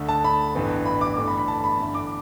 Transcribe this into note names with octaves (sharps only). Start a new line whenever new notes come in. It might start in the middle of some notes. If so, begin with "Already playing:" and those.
Already playing: D2 D3 A3
A5
B5
A1 G2 E3 B3
B5
D6
G1 G2 E3 A3 D6
B5
B5
A5
B5
G1 G2 E3
D6